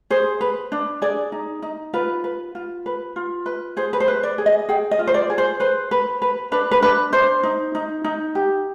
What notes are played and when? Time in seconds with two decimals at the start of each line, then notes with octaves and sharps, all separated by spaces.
0.10 G#4 C5
0.41 B4
0.72 D4
1.02 G#4 D5
1.32 D#4
1.62 D#4
1.94 F4 B4
2.24 B4
2.55 F4
2.86 B4
3.16 F4
3.46 B4
3.77 G#4 C5
3.93 B4
4.00 C5
4.08 B4
4.23 D5
4.38 G#4
4.46 D#5
4.69 G#4 G5
4.91 D#5
4.99 F4
5.07 C5
5.14 D5
5.30 G#4
5.38 C5
5.60 B4 C5
5.91 B4
6.22 B4
6.52 D4 B4
6.71 B4
6.83 D4 B4
7.13 D4 C5
7.43 D#4
7.75 D#4
8.04 D#4
8.35 G4